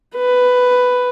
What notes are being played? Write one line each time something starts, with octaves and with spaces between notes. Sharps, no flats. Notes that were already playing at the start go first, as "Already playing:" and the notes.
B4